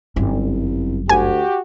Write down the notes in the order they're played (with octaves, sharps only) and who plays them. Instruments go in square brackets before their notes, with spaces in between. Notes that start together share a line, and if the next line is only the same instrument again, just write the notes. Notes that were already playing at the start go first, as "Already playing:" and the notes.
[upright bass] G1 F#2 [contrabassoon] C2
[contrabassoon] D2 [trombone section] F#4 G4 [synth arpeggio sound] G#5